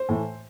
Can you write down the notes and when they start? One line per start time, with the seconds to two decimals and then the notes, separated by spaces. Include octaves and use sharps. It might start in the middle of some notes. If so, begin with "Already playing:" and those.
Already playing: C5
0.09 A2 E3 A3